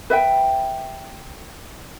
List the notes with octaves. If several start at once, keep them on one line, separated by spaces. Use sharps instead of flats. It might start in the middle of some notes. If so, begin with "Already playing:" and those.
B4 E5 G5